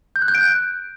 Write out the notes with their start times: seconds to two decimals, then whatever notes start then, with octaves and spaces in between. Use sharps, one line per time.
0.16 G6
0.22 F#6
0.28 G6
0.35 D7
0.41 F#6